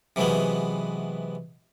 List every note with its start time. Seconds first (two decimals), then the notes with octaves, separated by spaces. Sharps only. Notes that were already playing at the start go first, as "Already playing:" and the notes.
0.16 C3 E3 F#3 G#3 B3